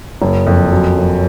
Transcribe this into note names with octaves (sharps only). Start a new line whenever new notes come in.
F#1
F2
F#2
F#2